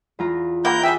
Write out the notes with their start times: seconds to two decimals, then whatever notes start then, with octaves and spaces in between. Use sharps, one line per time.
0.19 E2 F4 A#5
0.65 A#3 C4 E4 F#5 A#5 D6 G6
0.83 G3 G#4 E5 G5